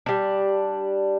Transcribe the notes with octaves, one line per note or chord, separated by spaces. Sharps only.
G3 D4